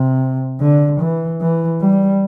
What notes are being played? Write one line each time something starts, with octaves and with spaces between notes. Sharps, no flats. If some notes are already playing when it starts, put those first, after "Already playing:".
Already playing: C3
D3
E3
E3
G3